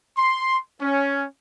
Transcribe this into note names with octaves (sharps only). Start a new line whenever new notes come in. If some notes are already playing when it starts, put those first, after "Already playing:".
C6
C#4